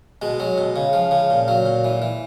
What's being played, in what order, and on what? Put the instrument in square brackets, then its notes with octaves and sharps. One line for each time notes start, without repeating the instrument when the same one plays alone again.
[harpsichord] B2 G#3
F#3
B2
C#3
F3
C#3
A#2
F#3
A#2
E3
E3